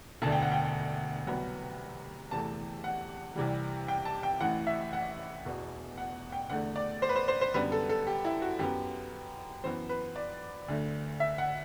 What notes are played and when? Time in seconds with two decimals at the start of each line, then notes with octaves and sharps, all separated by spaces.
0.22 E1 D2 D3 A3 A5
0.32 G5
0.42 F#5
0.52 G5
1.27 C2 C3 F#3 B3 F#5
2.31 E2 C3 E3 A3 A5
2.84 F#5
3.36 C2 C3 E3 G3
3.88 G5
4.05 A5
4.23 G5
4.41 A1 A2 E3 F#5
4.67 E5
4.93 F#5
5.45 E1 E2 B2
5.97 F#5
6.32 G5
6.50 E2 D3 A3 F#5
6.76 D5
7.02 C5
7.09 B4
7.16 C5
7.28 C5
7.41 C5
7.54 F#2 D3 G3 B3 B4
7.72 A4
7.89 A4
8.07 G4
8.24 E4
8.42 F#4
8.59 F#2 F#3 B3 G4
9.64 F#2 E3 B3 C5
9.89 B4
10.16 D5
10.68 D2 D3 A3
11.20 E5
11.38 F#5